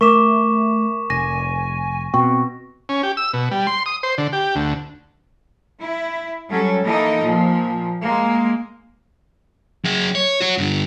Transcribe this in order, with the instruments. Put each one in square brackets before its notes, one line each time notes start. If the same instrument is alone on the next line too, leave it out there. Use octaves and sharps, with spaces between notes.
[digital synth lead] A3 [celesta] A#4 D6 [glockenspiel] C#6 B6 E7
[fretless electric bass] F1 [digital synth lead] G#5 [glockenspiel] A#6
[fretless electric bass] B2 [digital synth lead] C4 [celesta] C#6
[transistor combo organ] C#4
G4
E6
B2
G3
C6
D#6
C5
D3
G4
D2
[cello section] E4
F#3 G3 C#4 A4
E3 A#3 D#4 A4 D#5
A#2 F3
G#3 A#3
[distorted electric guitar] F#3 G#4
C#5
F#4 C#5
G2 D3